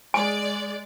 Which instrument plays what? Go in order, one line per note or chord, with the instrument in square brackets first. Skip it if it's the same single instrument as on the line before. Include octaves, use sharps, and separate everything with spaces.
[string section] G#3 D5 [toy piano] G#5